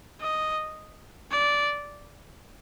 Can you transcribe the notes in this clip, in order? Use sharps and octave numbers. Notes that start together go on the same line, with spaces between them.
D#5
D5